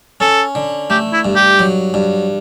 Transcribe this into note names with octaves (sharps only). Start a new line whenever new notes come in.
C#4 A4
D3
A3 G4
E4
G2
G4
F#3
G2